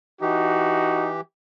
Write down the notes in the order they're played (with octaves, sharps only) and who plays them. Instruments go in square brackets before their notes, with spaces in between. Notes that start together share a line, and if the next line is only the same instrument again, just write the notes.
[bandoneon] E3 G4 [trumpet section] D#4 F#4